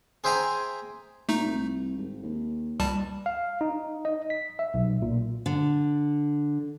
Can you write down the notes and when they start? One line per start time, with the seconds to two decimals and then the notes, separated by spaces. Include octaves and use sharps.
0.24 G#4 C5 E5 G5 G#5 A#5
1.29 A#2 A3 D#4
1.45 C2
1.96 G#1
2.23 D#2
2.80 C#2 G3 A5
3.26 F5
3.61 D#4
4.05 D#5
4.30 B6
4.59 E5
4.74 B1
5.02 A#2
5.46 D3